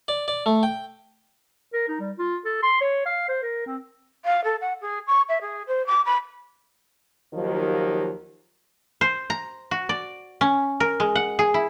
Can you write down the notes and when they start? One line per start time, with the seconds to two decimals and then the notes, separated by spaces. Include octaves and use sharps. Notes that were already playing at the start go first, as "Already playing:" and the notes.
0.08 D5
0.28 D5
0.46 A3
0.63 G5
1.73 A#4
1.88 D#4
2.00 G3
2.19 F4
2.45 A4
2.63 C6
2.81 C#5
3.06 F5
3.28 C5
3.43 A#4
3.67 C4
4.25 F5
4.44 A4
4.61 F#5
4.81 G#4
5.07 C#6
5.28 E5
5.41 G#4
5.67 C5
5.86 D6
6.05 B5
7.34 D#2 D#3 F3 F#3
9.01 C5
9.30 A#5
9.71 F#4
9.89 D5
10.41 C#4
10.80 A#4
11.00 G#3
11.15 F#5
11.39 G#4
11.54 E4